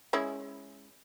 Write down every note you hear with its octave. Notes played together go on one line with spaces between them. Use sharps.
G#3 C#4 E4